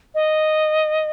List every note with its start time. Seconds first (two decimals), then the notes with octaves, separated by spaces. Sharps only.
0.14 D#5